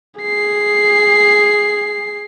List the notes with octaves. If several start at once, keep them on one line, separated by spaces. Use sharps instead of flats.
G#4 C7